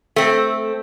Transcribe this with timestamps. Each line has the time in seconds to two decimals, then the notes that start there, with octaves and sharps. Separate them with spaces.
0.16 A3 C4